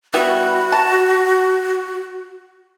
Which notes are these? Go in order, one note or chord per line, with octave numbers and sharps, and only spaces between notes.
G3 B3 E4 F#4
A5